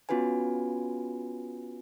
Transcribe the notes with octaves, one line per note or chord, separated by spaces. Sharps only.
B3 C#4 F4 F#4 B4 G#5